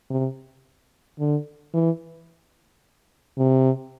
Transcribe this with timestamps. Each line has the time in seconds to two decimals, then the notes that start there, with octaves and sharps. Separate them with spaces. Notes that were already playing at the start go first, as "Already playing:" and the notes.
0.10 C3
1.19 D3
1.74 E3
3.38 C3